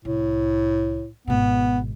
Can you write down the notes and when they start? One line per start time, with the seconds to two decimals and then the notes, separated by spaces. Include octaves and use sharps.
0.05 C2 A2
1.27 G#1 B2 B3